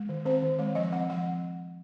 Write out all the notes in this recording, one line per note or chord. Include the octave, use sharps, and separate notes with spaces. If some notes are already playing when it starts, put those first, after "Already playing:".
Already playing: G#3
D#3
C4 C5
D#3
G#3 C#5
F3 D#5
C4 F#5
F3 F#5